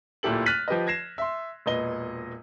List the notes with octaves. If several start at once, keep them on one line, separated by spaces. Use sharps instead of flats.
D1 A#2 E4 G4 A4 F#7
F6 F#6 A6 B6 D#7 F#7
F3 G4 B4 D#5
G#6 A#6 C7 E7
E5 C6
E1 A#2 B4 D#5 G7